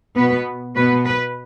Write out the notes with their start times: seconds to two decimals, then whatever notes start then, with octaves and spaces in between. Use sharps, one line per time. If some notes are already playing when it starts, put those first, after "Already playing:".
0.17 B2 B3 B4
0.76 B2 B3 B4
1.05 B4